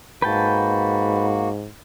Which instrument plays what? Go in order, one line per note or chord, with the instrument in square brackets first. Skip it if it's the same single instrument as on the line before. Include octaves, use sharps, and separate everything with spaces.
[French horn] G#2 [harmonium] A#3 F#4 [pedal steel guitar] B4 G5 A5